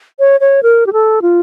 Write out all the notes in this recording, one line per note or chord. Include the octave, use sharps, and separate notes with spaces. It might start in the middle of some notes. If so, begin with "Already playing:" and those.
C#5
C#5
A#4
G4
A4
F4